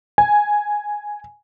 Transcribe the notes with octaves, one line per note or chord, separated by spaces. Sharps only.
G#5